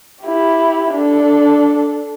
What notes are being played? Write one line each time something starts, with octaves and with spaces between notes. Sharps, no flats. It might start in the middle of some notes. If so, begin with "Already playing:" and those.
E4 G4
D4 A4